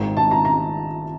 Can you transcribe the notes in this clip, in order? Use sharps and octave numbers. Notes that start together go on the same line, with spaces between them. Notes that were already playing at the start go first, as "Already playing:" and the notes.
Already playing: G#1 G#2 D#3
A5
A#5
A#5